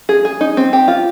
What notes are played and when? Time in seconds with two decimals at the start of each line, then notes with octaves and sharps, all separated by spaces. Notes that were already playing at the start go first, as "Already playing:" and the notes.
0.09 G#4
0.25 G#4
0.41 D#4
0.57 C4
0.73 G4
0.88 F4